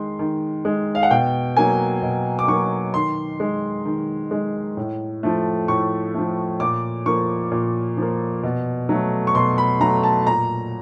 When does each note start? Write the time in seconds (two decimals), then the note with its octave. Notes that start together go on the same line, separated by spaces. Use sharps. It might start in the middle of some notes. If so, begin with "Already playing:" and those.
Already playing: D#3 G#3 C6
0.19 D#3
0.65 G#3
0.95 F5
1.03 F#5
1.11 B2 G5
1.57 F#3 A#3 G#5
2.02 B2
2.39 D6
2.48 F#3 A#3 C#6
2.94 D#3 C6
3.40 G#3
3.85 D#3
4.31 G#3
4.77 A2
5.23 F3 A3
5.68 A2 C#6
6.14 F3 A3
6.60 A#2 D6
7.06 F3 A#3 C#6
7.51 A#2
7.97 F3 A#3
8.43 B2
8.89 F#3 A3
9.27 C#6
9.35 B2 C6
9.58 B5
9.80 F#3 A3 A#5
10.03 A5
10.27 A#2 A#5